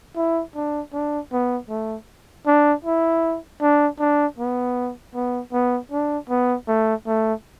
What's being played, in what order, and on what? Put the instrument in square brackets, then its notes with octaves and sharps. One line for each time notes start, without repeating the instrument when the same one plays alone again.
[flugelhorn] E4
D4
D4
B3
A3
D4
E4
D4
D4
B3
B3
B3
D4
B3
A3
A3